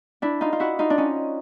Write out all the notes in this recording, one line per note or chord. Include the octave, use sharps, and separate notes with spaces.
D4 E4
D#4 F4
F4
E4 F#4
D#4 F4
D4
C#4 D#4